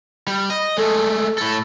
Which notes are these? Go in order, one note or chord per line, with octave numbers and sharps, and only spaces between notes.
G3
D#5
G#3 A3 A4
A2 A4